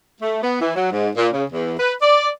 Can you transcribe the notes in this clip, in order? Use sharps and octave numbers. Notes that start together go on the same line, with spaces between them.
A3
B3
E3
F#3
G#2
A#2
C#3
E2
B4
D5